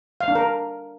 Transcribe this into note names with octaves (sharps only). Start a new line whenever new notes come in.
F5
D4
A#4